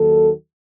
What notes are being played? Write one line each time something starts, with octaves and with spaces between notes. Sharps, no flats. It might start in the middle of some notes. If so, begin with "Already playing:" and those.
Already playing: D#2 D#3 F#3 A4